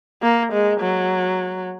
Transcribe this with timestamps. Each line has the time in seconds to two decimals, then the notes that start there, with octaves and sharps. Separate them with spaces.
0.23 A#3
0.53 G#3
0.80 F#3